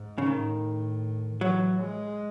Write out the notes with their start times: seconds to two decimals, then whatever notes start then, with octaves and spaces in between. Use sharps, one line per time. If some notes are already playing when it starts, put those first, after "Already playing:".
Already playing: G#2
0.18 C#3
0.26 A2 D#3
1.41 E3 F#3
1.80 G#3